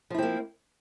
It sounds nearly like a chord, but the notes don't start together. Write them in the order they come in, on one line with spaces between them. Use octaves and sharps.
F3 E4 C4 A#3